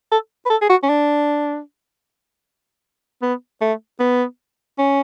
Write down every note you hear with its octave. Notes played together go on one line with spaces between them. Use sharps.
A4
B4
A4
G#4
F#4
C#4
D4
B3
A3
B3
C#4